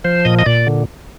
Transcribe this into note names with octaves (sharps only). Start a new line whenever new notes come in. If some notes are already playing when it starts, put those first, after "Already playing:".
F3 C5
A#2 D#5
D#5
A#2 D5
D3